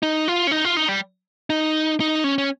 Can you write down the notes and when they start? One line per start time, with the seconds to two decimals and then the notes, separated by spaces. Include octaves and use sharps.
0.03 D#4
0.28 F4
0.47 C#4
0.51 D#4
0.65 F4
0.77 D#4
0.88 G3
1.50 D#4
2.00 D#4
2.24 C#4
2.38 C#4